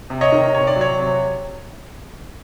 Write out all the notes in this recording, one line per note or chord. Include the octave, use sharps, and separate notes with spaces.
C3
C#5 D#5
D#3
C3 C#5
D5
F#3
C#5
C3